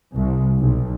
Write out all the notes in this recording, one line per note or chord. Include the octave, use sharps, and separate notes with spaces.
C2
B1